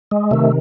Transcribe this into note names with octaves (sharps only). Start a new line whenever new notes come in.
G#3
C3 D#3 A3